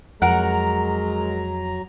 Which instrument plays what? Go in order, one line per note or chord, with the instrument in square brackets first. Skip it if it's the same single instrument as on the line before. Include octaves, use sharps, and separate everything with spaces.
[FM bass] F2 [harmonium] F#3 A#5 [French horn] G#3 [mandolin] A#4 F#5